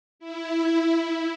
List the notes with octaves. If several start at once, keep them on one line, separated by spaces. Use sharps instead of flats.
E4